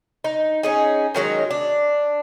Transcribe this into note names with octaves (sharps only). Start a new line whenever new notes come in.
D#4
C#4 D#4 G#4
D#3 F#3 G#3 C#4
D4